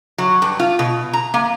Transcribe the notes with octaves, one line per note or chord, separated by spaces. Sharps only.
F#3
G2
F4
B2
A#5
A#3